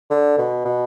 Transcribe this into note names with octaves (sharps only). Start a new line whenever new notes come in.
D3
B2
B2